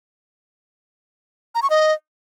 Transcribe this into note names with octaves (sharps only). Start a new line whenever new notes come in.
A#5
C#6
D#5